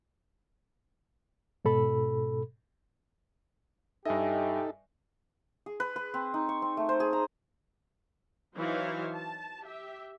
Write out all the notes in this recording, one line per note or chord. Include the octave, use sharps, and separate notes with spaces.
G#2 B2 A4 B5
G2 D#4 G4 A4 D#5 E5 G#5
G#4
B4
B4
C4
D#4
C#6
C4
A3
C5
G#4
A#5
E3 F#3 D#4 C5 C#5 F5
A5
G4 E5